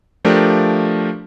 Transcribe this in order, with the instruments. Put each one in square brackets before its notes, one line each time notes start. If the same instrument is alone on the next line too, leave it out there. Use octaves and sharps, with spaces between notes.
[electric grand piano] F3 A3 D4 G4 A#4